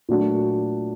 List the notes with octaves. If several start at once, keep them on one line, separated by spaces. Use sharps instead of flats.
A#2 F#3 A3 D4 F#4